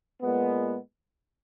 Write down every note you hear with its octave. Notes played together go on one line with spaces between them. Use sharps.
A#2 G#3 B3